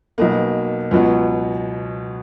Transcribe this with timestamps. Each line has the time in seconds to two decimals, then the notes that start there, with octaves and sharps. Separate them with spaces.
0.18 B1 B2 A#3
0.91 C#2 B2 F#3 B3